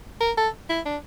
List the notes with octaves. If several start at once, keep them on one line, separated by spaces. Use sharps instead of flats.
A#4
A4
E4
D4